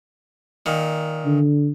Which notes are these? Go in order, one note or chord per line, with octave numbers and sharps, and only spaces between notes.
A#2 D#3
D3